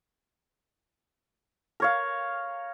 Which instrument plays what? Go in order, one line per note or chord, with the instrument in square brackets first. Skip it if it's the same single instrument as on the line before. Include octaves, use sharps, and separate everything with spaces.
[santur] A#4 C#5 F5